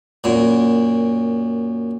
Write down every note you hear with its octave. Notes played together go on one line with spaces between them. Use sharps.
F#2 A#2